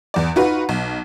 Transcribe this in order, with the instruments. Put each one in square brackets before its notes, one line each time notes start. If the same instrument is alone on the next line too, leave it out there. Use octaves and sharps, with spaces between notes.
[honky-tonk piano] E2 D5
D#4 F4 F#4 B4
B1